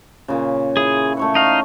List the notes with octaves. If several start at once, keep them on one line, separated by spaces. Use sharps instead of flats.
A#2 C#3
E4 G#4
A3 C#5 F#5
D#4 F5